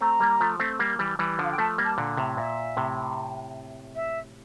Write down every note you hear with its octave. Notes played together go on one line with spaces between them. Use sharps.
A3 C4 A#5
G3 A#3
F3 A3
A3 C4
G3 A#3
E3 G3
E3 G3
D3 F3 F5
G5
F3 A3 A5
G3 A#3
A5
A#2 D3
A2 C3
A#2 E5
A2 C3
E5